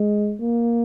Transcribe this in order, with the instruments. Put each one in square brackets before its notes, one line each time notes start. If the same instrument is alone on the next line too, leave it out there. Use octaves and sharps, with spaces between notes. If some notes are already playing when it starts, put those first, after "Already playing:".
Already playing: [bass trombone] G#3
A#3